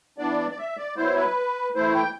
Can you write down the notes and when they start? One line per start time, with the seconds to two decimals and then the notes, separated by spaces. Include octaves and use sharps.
0.18 E3 B3 D4 D5
0.51 D5
0.58 E5
0.77 D5
0.97 F#3 B3 E4 C5
1.16 B4
1.75 E3 A3 E4 C5
1.95 G5